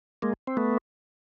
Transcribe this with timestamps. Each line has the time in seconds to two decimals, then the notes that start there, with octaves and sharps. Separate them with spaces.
0.22 G#3 A#3
0.47 C4
0.57 A3 B3